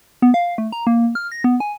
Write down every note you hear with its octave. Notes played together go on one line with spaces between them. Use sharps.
B3
F5
A3
A#5
A#3
F6
A#6
B3
G#5